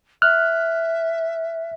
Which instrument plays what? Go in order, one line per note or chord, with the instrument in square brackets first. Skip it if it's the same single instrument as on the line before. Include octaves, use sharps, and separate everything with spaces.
[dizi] E5 [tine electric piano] F6 F#6